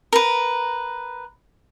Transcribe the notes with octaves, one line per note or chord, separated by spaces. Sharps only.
A#4 B4